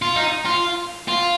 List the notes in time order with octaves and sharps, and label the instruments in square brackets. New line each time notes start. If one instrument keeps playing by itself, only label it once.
[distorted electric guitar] F4
D#4
F4
F4